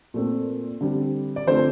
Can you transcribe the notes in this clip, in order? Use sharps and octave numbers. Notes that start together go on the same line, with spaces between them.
A#2 A3 C4
D3 G3 C4
D5
D3 F3 A3 C4 C5